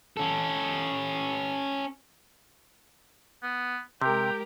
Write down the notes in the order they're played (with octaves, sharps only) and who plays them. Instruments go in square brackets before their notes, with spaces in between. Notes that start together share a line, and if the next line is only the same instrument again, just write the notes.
[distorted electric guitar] C#4 A4
[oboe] B3
[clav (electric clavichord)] C3 [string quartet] G#3 G4 A#4 [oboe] G5